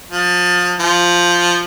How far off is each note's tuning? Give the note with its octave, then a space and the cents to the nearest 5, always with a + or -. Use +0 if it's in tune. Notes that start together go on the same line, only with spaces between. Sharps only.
F3 +30
F3 +0